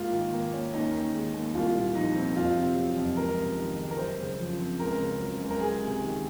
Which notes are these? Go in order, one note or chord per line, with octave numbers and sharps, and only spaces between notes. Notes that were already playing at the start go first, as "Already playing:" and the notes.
Already playing: G#2 A#3 F4
D#3
A#3
C#4
D#2 D#4
D#3
G#3
D#2
C2 F4
A#2
F3 D#4
C4
F2 F4
C3
F#3
F2
C#2 A#4
C3
D#3
G#3
A#4
F#2 C5
C#3
F3
C4
C#2 A#4
C#3
F#3
C#2
A#4
C#2 G#4
C3
D#3